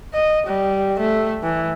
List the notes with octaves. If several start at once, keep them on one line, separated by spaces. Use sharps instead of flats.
D#5
G3
A3
E3